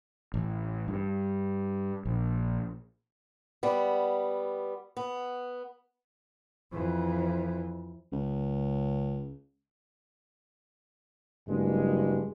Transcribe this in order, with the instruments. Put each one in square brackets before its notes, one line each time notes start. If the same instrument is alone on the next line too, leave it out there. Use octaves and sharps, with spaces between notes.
[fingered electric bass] A1
G2
A#1
[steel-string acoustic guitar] G3 B3
B3
[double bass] F2 E3
[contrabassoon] C#2
[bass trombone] F#1 [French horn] G2 [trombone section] G#3